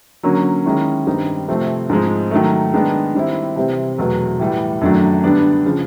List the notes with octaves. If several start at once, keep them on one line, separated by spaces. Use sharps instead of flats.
D3 F#3 A#3 C#4
D#3 G#3 C#4 E4
G2 D#3 G3 C4 D#4
C3 F3 A3 C4
G#2 F3 G#3 C4
D#3 F#3 A3
D#3 G#3 B3 D4
D#3 G3 C4 E4
C3 E3 G3 C4
E2 B2 F#3 A3
A2 E3 G3
F#2 D#3 F#3 A3 D4
D3 G3 B3 D4
C#3 F3